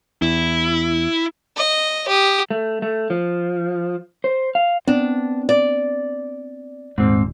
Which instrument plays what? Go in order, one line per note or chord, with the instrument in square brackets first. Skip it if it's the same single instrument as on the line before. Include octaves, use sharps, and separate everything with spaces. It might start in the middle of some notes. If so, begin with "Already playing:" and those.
[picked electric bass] E2 [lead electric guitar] E4
[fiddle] D#5
G4 D#6
[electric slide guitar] A3
A3
F3
C5
F5
[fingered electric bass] B3 C4 [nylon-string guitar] D4
[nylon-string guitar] D5
[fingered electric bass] D#1 [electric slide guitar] G#2 C4